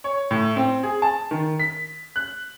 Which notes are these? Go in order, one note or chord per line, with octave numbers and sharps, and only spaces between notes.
C#5
A2
C4
G#4
A5
D#3
B6
F#6